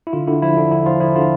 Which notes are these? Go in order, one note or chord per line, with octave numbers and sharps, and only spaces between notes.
E4
D3 F4
D3 E4
F3 E4
D3 D4
D3 E4
F3 F4
F3 E4
D3 F4